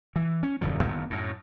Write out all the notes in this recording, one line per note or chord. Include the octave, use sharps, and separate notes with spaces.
E3
C#4
D#1 F#2 D3 F3
F#1 D#2 D#3 B3
F#2 A2